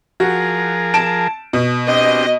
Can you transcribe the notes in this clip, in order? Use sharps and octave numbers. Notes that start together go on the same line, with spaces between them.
F3 F#4 G#4 A#4
A5 D7 E7
B2
C4 D4 G4 D#5